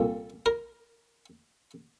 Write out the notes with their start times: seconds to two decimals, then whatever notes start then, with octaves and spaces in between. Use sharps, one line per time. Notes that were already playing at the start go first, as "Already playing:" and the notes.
Already playing: C2 A#2 A4
0.46 A#4